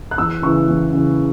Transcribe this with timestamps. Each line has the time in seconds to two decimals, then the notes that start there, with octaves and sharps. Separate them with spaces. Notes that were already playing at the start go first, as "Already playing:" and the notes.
0.11 F#6
0.18 E2 E6
0.42 C#3 E3 C#6
0.68 E2
0.92 C#3 E3